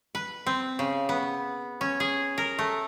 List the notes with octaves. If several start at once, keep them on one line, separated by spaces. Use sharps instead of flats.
B4
C4
C#3
B3
C#4
G#4
A#4
A3